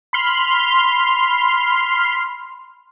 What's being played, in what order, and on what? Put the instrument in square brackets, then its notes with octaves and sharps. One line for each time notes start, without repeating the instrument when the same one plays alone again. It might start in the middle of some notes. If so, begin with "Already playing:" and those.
[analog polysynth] B5 C6 F6